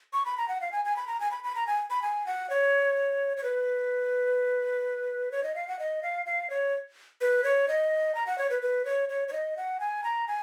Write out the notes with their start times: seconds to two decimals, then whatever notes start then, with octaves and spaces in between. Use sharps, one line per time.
0.13 C#6
0.25 B5
0.38 A#5
0.48 F#5
0.61 F5
0.72 G#5
0.85 G#5
0.96 B5
1.07 A#5
1.20 G#5
1.31 B5
1.44 B5
1.55 A#5
1.67 G#5
1.90 B5
2.02 G#5
2.26 F#5
2.50 C#5
3.37 C#5
3.43 B4
5.32 C#5
5.43 D#5
5.55 F5
5.68 F#5
5.79 D#5
6.03 F5
6.26 F5
6.50 C#5
7.21 B4
7.44 C#5
7.68 D#5
8.15 A#5
8.26 F#5
8.38 C#5
8.50 B4
8.62 B4
8.85 C#5
9.09 C#5
9.28 C#5
9.33 D#5
9.57 F#5
9.80 G#5
10.04 A#5
10.28 G#5